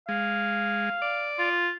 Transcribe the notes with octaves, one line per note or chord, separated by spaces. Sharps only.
G#3 F5
D5
F4